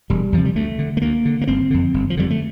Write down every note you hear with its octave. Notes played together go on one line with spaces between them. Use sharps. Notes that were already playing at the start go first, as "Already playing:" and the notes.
E1 G3
E2 C3 F3
G3
D2 A3
D3
A3
D2 A#3
D3
A#3
G1 C4
F2 D3
G1
F3
F2 D3 G3
A3